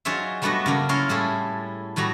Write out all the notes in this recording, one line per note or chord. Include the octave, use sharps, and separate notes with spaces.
F#3 D#4 F4 G#4 C#5 E5
G3 A3 B3 D4 F#4 D#5
C#3 F#3 A#3
C#4 E4 F4 A#4 C#5 C6
A2 G3 E4 G#4 A4
A2 F#3 G3 F#4 A#5